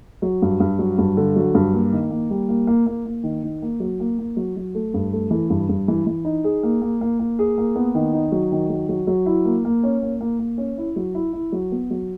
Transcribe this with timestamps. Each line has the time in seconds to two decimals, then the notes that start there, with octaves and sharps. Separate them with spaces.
0.22 F#3
0.42 G2
0.60 G2
0.79 F#3
0.98 G2
1.17 D3
1.36 F#3
1.54 G2
1.73 A#3
1.92 D#3
2.10 A#3
2.30 G3
2.49 A#3
2.67 A#3
2.86 A#3
3.05 A#3
3.23 D#3
3.43 D#3
3.62 A#3
3.80 F#3
4.00 A#3
4.19 A#3
4.37 F#3
4.56 F#3
4.75 A3
4.94 G2
5.13 A3
5.31 E3
5.50 G2
5.69 G2
5.88 E3
6.06 E3
6.25 D#4
6.44 G#4
6.63 A#3
6.82 A#3
7.01 A#3
7.19 A#3
7.39 G#4
7.58 A#3
7.76 B3
7.95 D#3
8.13 D#4
8.32 F#3
8.52 D#3
8.69 F#3
8.89 F#3
9.07 F#3
9.26 E4
9.45 A#3
9.65 A#3
9.83 C#4
10.02 A#3
10.21 A#3
10.39 A#3
10.58 C#4
10.78 E4
10.96 F#3
11.15 E4
11.33 E4
11.52 F#3
11.72 B3
11.90 F#3